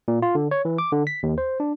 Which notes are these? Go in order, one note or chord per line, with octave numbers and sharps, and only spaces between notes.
A#2
F4
D3
C#5
E3
D6
D3
B6
D#2
C5
D4